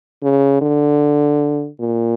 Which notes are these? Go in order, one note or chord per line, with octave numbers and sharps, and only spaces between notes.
C#3
D3
A#2